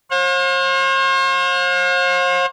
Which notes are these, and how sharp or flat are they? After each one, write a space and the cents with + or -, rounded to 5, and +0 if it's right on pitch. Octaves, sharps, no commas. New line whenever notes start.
C5 +45 F5 +45